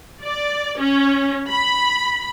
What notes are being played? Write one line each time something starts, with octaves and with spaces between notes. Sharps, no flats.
D5
C#4
B5